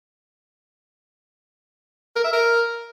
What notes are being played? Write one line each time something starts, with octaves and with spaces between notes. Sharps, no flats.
A#4
E5
A#4